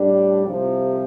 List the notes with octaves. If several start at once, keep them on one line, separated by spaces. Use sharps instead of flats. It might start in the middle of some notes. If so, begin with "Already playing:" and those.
Already playing: A2 G3 D4
C2 C3 F3